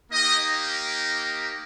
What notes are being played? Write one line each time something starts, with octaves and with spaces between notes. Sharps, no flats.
A#3 D#4 G4 D#5